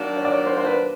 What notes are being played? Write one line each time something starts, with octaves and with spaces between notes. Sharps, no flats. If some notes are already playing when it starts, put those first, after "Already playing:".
Already playing: D#3 F#3 A#3 D4
C#5
D5
C#5
C5
C5
B4